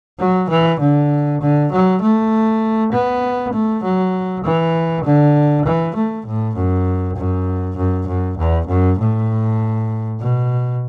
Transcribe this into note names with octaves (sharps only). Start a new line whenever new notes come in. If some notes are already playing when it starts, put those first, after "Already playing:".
F#3
E3
D3
D3
F#3
A3
B3
A3
F#3
E3
D3
E3
A3
A2
F#2
F#2
F#2
F#2
E2
F#2
A2
B2